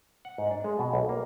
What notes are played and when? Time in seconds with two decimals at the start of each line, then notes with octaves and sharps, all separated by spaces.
0.25 F#5
0.38 G#2
0.51 D4
0.64 G#3
0.79 B2
0.94 B1
1.09 A#3